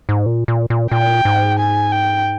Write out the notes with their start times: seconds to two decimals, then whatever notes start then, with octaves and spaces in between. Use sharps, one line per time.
0.09 G#2
0.26 A#2
0.48 A#2
0.70 A#2
0.91 A#2 G5
1.25 G#2
1.59 G#5
1.92 G5